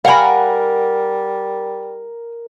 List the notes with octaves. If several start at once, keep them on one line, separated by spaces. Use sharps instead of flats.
G3 A#4 F5 F#5 G#5 B5